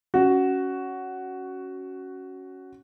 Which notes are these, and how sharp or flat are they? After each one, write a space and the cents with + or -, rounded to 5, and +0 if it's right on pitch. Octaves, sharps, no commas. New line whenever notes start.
C#4 +0 F#4 +10